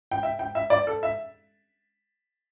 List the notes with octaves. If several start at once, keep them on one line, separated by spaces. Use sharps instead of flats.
G5
E5
G5
E5
D5
A4
E5